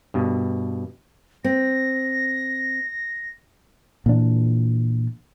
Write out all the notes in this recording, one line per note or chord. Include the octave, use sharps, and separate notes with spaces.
G2 B2
C4 A#6
A#2 E3 D4